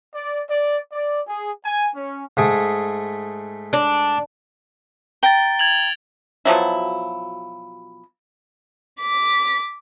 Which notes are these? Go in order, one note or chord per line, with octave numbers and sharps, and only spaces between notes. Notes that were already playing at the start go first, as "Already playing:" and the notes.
D5
D5
D5
G#4
G#5
C#4
G#2 A3 G#4
D4
G5 A#5 A6 D7 G7
G#6 F7 F#7
B2 F3 F#3 E4
D6 B6